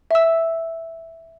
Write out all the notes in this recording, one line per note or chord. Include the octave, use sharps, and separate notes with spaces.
E5 E6